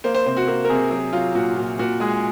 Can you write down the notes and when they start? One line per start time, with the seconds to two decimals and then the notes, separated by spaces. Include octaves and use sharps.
0.04 A#3 C5
0.15 C5
0.26 C3 C5
0.37 F#4
0.48 A#3 F#4
0.65 A#4
0.69 C3 G#4
0.91 F#3 G#4
1.13 F#3 F4
1.35 A#2 F#4
1.56 A#2
1.79 A#2 F#4
2.00 G#3 G#4